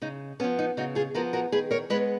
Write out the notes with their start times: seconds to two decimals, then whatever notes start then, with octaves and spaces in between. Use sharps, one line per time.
0.02 C#3 D#4
0.40 B3 C#4
0.44 F3
0.59 D#4
0.77 C#3 D#4 F#4
0.95 F4 G#4
1.15 F3 B3 F#4 A#4
1.33 F#4 A#4
1.52 D#3 G#4 B4
1.71 A#4 C#5
1.90 G#3 B3 G#4 B4